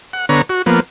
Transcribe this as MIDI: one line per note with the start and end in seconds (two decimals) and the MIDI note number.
0.13 0.26 78
0.29 0.42 50
0.29 0.42 59
0.29 0.42 73
0.29 0.42 82
0.49 0.62 66
0.66 0.80 53
0.66 0.80 58
0.66 0.80 59